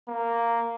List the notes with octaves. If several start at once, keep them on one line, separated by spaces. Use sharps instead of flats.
A#3